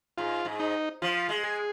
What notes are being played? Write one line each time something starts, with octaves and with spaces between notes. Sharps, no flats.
G#2 F4
G#2
D#4
F3 F4
G#3
G#4